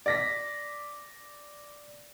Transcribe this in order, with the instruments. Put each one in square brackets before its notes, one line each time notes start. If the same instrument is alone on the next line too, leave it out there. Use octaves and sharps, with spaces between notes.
[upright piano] D5 A#6 B6